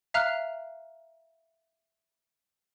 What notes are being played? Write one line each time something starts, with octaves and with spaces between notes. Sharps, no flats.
E5 F5 A#5 F6 F#6